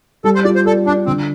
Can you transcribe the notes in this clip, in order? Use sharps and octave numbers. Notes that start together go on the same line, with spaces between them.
G3 A4
C5
F4 D5
C5
A4 D5
D4 D5
D3 C4